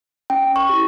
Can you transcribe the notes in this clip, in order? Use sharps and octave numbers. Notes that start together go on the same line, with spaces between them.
C#4 G5
C#6
E4 G4